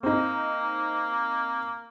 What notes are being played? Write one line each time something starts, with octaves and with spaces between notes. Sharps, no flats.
A#3 C4 D#4